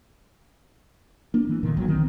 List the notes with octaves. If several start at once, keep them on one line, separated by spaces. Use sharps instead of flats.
A#3 D4
E3 A#3
A#2 D3 D#3
A#1 A#2 F3 F#3
D#3 C4